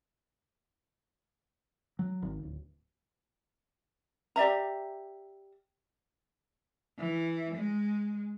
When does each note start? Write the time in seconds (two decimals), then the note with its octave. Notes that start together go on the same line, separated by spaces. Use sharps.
1.99 F#3
2.22 G#1
2.43 D1
4.36 G4 D5 E5 A#5
6.99 E3
7.55 G#3